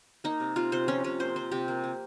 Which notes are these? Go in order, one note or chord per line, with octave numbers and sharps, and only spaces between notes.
A#3 D#4
C3
C3 F4
C3 C5
F3 C#4
C3 C#4
A#3 C5
F3 C5
C3 G4
A#3
A#3